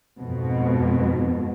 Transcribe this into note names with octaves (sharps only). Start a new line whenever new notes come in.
F2 G#2 B2